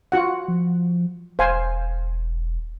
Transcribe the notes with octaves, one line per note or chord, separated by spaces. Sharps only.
F4 F#4 F#5
F3
E1 C5 F5 G#5